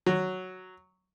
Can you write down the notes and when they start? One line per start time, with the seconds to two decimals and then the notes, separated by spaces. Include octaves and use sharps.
0.06 F#3